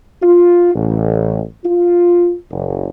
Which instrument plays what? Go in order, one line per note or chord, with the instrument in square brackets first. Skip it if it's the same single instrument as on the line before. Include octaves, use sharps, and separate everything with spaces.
[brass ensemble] F4
A1
F4
F#1